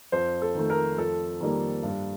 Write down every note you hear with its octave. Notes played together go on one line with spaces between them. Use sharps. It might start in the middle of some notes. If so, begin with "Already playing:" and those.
F2 C5
A4
D#3 A3
A#4
F2 A4
D#3 G3 A#3
G2